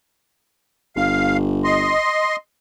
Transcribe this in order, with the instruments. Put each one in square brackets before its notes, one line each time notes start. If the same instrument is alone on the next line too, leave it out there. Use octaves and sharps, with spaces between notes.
[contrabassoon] G1 [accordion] F5
[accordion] D#5 C6